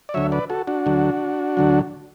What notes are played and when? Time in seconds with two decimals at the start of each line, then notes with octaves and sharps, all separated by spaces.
0.09 D5
0.14 D2 D3 F#3 C#5 E5
0.32 B4 D5
0.50 F#4 A4
0.67 D4 F#4
0.86 D2 D3 F#3
1.57 D2 D3 F#3